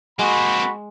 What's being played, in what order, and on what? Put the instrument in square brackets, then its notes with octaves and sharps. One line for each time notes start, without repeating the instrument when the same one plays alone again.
[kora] G#3 [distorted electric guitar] A#3 C4 [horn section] F#4 B5